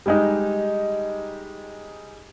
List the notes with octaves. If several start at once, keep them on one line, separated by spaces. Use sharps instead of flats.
G3 G#3 D#4